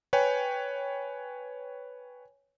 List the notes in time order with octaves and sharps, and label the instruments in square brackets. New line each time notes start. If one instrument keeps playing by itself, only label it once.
[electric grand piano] B4 C#5 G5 G#5